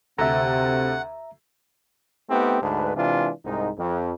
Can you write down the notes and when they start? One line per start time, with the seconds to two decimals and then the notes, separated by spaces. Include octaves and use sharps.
0.18 D2 C3 A4 E5 F#5 A#5
2.30 A3 B3 C4 D#4 G4
2.62 D2 G#2 D4 B4
2.96 C3 E3 G#3 D4 F4
3.45 C2 G#2 D#4
3.79 F2